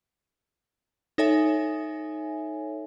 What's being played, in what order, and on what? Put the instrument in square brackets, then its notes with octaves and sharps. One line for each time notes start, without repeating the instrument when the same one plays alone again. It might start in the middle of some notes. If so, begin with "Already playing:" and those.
[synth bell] D#4 A4 C#5 E5 G#5